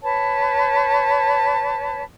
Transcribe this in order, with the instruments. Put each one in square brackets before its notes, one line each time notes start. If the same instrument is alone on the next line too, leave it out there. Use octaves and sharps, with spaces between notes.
[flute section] B4 C#5 A5